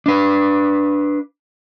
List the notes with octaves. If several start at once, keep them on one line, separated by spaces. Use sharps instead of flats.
D4 B4